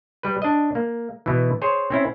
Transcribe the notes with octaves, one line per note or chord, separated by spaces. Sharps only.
G3 B4
D4 D#5
A#3
B2 E3
G#4 C5 C#5
C4 C#4 E4